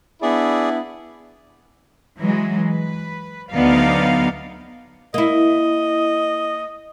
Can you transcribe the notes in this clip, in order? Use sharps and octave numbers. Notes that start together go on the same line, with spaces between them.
B3 D4 E4 G#4 D5
E3 F#3 G#3
B4
D2 F#3 B3 D#4 D5 F5
A#3 E4 D#5